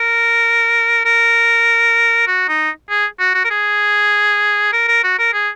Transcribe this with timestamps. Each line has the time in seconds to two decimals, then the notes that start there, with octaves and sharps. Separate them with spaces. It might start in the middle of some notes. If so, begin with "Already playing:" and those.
Already playing: A#4
1.05 A#4
2.27 F#4
2.48 D#4
2.89 G#4
3.20 F#4
3.34 F#4
3.44 A#4
3.50 G#4
4.72 A#4
4.88 A#4
5.04 F#4
5.19 A#4
5.33 G#4